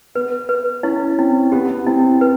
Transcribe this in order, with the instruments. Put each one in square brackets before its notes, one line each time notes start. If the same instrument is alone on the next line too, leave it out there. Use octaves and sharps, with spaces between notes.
[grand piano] B3 [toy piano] B4
[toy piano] B4
[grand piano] C#4 [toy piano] E4
[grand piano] C4 [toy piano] E4
[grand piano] B3 [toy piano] G4
[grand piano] B3
[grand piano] C4 [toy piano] E4
[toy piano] B4